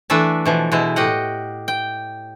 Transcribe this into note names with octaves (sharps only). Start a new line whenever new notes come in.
E3 A3 D4 B4 E5 A5
B2 E3 F3
B2 G#3 E4
A2 G4 D#5 F#5
G5